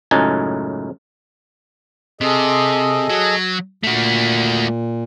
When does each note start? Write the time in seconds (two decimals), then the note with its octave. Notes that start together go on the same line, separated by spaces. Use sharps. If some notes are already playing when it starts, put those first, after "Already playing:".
0.11 C#2 F#2 A2 D#4 G#5 A5
2.21 C3 G#4 A4 D#5
3.10 F#3
3.83 A#2 A3 F#4